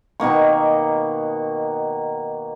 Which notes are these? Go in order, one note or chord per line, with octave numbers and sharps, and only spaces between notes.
B2 D#3 A#3 C#6